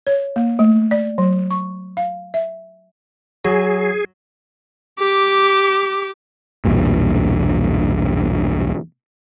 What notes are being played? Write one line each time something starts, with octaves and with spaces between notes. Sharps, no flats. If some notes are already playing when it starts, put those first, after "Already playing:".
C#5
A#3
A3
D5
F#3
C#6
F5
E5
F#3 G#4
G4 D6
B1 E2 G2 A#2